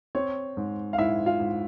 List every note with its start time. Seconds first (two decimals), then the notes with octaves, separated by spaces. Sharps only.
0.15 C4 C#5
0.57 G#2
0.93 F5
0.98 G#2 E4 E5
1.26 F4 F5
1.40 G#2